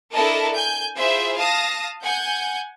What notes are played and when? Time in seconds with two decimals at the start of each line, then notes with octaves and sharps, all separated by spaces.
0.13 D4 E4 A4 A#4 D#5 A5
0.54 G#5 G6
0.97 E4 F4 G#4 C5 E5
1.37 F5 A5 D#6 A#6
2.03 F#5 G#5 G6